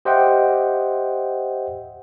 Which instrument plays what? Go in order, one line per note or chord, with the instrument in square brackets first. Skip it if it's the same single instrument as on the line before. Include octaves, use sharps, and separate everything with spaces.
[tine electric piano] G4 C5 D#5 E5 F#5 G5